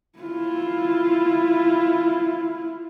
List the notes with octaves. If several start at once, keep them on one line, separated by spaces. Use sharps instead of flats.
E4 F4